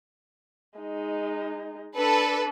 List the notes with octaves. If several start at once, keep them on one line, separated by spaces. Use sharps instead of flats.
G#3 D#4
D4 A4 B4